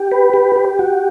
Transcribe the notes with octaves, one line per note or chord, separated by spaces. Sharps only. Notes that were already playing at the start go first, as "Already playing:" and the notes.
Already playing: G4
B4
G4
G4
F#4